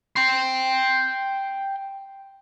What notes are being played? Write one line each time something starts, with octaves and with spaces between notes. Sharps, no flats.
G5 C6